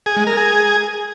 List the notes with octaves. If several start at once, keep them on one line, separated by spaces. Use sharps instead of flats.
G#4
G#3
A#4
G#4